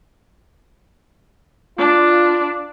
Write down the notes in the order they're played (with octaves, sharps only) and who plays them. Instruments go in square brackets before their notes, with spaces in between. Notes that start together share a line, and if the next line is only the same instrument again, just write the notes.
[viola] D4 [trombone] F4